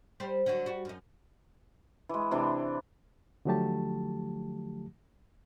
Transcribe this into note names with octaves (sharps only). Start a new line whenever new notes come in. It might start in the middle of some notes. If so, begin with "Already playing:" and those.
G3 G4 C5
D3 F#3
G3 F#4
F#2 D#4
E3 G#3
C3 E3 D4
D3 F3 F#3 A3 G4 A5